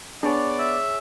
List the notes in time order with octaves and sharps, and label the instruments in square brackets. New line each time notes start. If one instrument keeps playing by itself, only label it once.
[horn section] B3 D5 [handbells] D4 [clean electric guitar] G#4 C#5
[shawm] E5